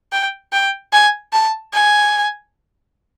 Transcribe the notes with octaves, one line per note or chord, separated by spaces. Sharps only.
G5
G5
G#5
A5
G#5